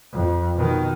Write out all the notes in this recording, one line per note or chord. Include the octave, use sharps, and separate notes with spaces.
F2
B2 D#3